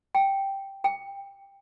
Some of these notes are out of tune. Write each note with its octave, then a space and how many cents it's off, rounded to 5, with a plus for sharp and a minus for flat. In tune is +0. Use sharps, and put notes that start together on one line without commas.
G5 +0
G5 +15